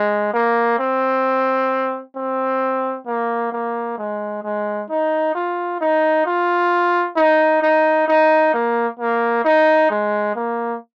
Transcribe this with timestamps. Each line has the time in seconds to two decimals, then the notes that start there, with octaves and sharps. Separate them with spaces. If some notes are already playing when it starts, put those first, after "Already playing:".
Already playing: G#3
0.33 A#3
0.79 C4
2.16 C4
3.07 A#3
3.52 A#3
3.98 G#3
4.43 G#3
4.90 D#4
5.35 F4
5.81 D#4
6.26 F4
7.17 D#4
7.63 D#4
8.08 D#4
8.54 A#3
9.00 A#3
9.45 D#4
9.90 G#3
10.36 A#3